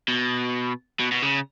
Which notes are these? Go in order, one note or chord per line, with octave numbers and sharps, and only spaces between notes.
B2
B2
B2
C#3